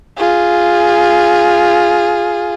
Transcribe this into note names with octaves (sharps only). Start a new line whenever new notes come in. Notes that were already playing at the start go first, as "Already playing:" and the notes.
F4 G#4